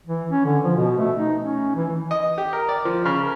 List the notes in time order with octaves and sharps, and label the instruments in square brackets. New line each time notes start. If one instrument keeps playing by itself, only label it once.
[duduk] E3
C#4
D3
F3
B2
A3
D#4
C#4
E3
[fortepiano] D#5
G4
A#4
D5
F3
C#3
A#4